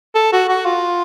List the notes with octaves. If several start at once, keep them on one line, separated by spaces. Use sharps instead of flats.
A4
F#4
F#4
F4